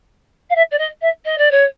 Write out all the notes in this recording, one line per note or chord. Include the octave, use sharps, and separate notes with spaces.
F5
E5
D5
D#5
E5
D#5
D5
C#5